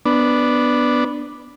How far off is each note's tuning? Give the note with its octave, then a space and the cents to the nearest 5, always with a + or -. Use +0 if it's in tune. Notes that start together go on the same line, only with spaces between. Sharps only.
B3 +0 D4 +0